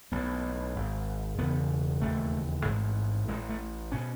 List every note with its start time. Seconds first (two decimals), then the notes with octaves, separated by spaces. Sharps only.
0.12 B1 A2 B3
0.75 G#1 G#2
1.38 E1 E2 C#3 B3
2.02 E1 D#2 C#3 A3
2.65 A1 G#2
3.28 A1 A2 G#3
3.49 A3
3.92 B2 C#4